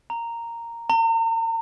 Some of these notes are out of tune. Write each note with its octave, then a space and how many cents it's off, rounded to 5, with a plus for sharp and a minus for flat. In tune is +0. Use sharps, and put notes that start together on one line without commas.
A#5 -5
A#5 -40